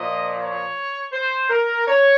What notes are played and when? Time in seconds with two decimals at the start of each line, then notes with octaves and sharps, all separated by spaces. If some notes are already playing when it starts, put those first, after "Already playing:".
Already playing: A#2 F3 D#5
0.38 C#5
1.13 C5
1.49 A#4
1.87 C#5